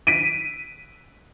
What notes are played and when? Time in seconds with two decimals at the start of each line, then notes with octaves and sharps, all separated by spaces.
0.07 B6 D7 D#7